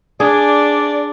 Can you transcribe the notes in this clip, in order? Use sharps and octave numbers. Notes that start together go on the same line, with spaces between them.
D4 G#4 D5